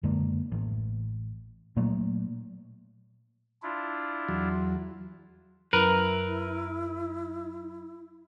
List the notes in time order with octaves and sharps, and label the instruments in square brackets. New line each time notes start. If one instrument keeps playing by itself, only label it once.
[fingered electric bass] F#2 D3 G#3 A#3
A1
A#2 F#3 A3 A#3
[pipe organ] D4 E4 F4
[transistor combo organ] E2 F#3
[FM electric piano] F#2 [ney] E4 [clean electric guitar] A#4 B4